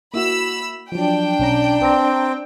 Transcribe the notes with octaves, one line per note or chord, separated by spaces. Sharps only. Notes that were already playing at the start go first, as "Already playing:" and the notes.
A#3 E4 F#4 B5 E6
F3 F#3 D4 G5
B1 C#4 A#5
C4 B4 D5 A#5